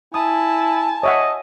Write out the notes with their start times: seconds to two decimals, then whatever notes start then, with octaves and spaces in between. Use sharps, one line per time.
0.14 E4 G#5 A5 D#6
1.03 C#5 D#5 E5 F#5